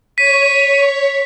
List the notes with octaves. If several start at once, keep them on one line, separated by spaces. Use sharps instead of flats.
C#5 B6 D#7